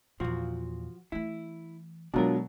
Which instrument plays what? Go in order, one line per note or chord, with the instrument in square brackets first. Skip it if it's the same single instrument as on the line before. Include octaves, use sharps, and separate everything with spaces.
[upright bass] E2 A#2 [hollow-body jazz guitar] F3 F#4
[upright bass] E3 A3 [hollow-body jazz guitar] E4
[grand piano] B2 F#3 [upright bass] D3 G#3 [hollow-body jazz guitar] D4 F4 A#4